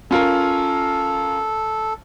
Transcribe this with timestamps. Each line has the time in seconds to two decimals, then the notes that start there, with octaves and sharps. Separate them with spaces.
0.11 C#4 F4 A4 A#4